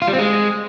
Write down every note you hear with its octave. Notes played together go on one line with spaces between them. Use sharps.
F4
G3
C4
G#3